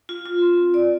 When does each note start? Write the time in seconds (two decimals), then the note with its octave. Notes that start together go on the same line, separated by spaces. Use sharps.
0.09 F4
0.26 F4
0.42 C4
0.58 C4
0.74 D5